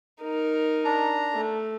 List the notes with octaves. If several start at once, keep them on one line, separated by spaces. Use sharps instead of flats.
D#4 A#4
D4 A#5
A3